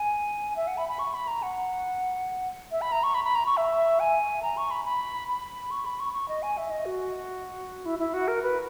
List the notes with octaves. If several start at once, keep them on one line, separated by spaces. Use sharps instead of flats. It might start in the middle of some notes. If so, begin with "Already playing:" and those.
Already playing: G#5
E5
F#5
B5
B5
C#6
B5
A#5
F#5
E5
B5
A#5
C#6
B5
B5
A#5
C#6
E5
G#5
A#5
C#6
B5
B5
B5
C#6
B5
C#6
C#6
D#5
G#5
E5
D#5
F#4
E4
E4
F#4
A#4
B4